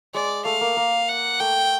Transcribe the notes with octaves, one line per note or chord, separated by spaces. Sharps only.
G#3 D5
A3 F5
A#3
A#3
F#5
A3 G5